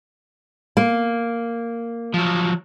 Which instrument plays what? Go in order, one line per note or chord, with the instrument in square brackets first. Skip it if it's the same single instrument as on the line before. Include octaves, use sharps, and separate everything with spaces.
[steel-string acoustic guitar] A#3
[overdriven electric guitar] F3 F#3